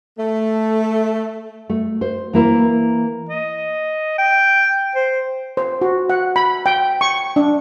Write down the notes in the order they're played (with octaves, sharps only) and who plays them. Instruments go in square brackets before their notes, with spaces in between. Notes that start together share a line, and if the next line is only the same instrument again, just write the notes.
[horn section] A3
[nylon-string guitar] A3
C5
E3 A#3 E4
[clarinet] D#5
G5
C5
[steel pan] C5
F#4
F#5
B5
G5
C#6
D4